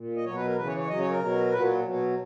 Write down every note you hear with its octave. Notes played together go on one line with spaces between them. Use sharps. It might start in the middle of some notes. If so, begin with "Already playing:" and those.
Already playing: A#2
D#5
B2 F#3 C#5
B4
A#4
C#3 E3 B4
C#5
C#5
C#3 F#3 D#5
C#5
A#4
B2 F#3
A#2 F#3 B4
B2 F#3